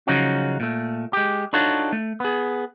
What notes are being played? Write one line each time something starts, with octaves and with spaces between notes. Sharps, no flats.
C#3 F3 F#3 C#4 D#4 F#4
A#2 A3
G#3 G4
D4 D#4 F4 F#4 A4 C#5
A3
B3 G#4